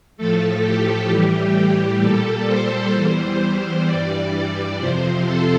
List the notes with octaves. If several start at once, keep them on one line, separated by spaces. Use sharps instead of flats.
A2 F3 A3 A4
G4
A2 E3 G3
G4
A#2 G3 A4
C5
E2 E3 G3 C5
G2 E3 G3 D5
F2 C3 F3 C5
A4